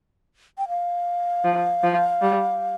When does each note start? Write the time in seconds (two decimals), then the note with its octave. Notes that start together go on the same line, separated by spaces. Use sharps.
0.58 G5
0.68 F5
1.44 F3
1.83 F3
2.22 G3